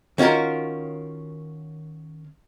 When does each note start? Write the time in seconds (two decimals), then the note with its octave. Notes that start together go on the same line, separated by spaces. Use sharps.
0.18 D#3 C#4 F4 F#4 A#4